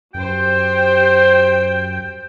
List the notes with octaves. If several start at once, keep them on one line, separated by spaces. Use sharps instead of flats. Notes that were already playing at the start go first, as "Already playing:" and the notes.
F#2 G4 C5 G5